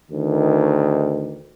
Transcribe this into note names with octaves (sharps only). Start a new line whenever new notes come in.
D2 D#3